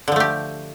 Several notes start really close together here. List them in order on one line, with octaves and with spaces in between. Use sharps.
D3 F3 A3 G4